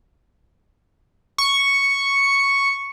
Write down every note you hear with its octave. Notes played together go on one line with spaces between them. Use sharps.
C#6